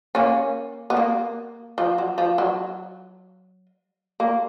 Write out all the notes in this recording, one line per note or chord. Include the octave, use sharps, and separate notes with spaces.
A#3 C#4
B3
A#3
F3
F#3
F3
F#3
A#3